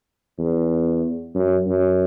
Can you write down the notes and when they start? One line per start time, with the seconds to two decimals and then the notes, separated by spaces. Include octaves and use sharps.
0.39 E2
1.35 F#2
1.67 F#2